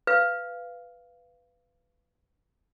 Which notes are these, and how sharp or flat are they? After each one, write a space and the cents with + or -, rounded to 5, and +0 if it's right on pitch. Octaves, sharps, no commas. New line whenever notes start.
B4 +5 F5 -15